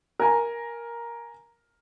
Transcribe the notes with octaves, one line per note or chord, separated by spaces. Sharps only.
A#4 G#5 A#5